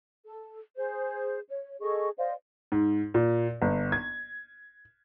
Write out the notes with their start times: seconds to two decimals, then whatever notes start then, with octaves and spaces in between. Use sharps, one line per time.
0.26 A4
0.77 G#4 C5
1.49 C#5
1.81 G#4 A4 D#5 C#6
2.18 C5 D5 D#5 F5
2.72 G#2
3.14 A#2
3.62 G1
3.92 G#6